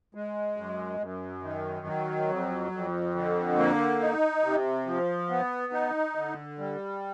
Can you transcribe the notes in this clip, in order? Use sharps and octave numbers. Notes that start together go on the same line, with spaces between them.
G#3
F#2
F#2
D#3
F#3
F2
F2
D3
A#3
D#4
C3
F3
B3
D#4
D3
G3